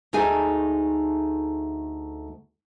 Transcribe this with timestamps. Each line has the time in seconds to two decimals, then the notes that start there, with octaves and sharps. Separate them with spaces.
0.13 D2 A3 D#4 G#4 G#5